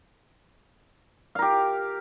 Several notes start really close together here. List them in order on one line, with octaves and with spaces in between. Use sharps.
F5 A#4 G4